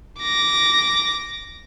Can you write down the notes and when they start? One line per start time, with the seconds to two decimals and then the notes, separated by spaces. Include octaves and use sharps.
0.20 D6 A#6